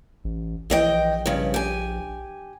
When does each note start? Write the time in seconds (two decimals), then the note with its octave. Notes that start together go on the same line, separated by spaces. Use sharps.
0.24 A1
0.70 A#1 E3 D#5 G5
1.26 G2 C#3
1.54 G4 G#5